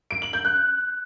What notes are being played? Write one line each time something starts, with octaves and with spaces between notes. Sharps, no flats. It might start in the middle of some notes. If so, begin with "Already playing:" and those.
D7
F#7
G6
F#6